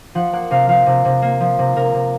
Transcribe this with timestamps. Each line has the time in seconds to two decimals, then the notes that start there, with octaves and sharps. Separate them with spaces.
0.15 F3 F#5
0.33 A#3 F#5
0.51 C3 F5
0.69 F3 F5
0.86 C3
1.05 C3
1.22 A#3
1.41 F3
1.59 C3
1.76 C3 A#4
1.94 C3